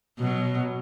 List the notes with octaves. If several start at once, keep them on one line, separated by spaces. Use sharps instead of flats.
B2 F#3